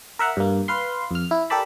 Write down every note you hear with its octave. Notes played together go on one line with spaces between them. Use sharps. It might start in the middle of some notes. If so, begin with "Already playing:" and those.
A#4 E5 F#5 A#5
G2 A#3
B4 F5 C6
F2 F6
E4
G4 A4 A#4 D5 A5 B5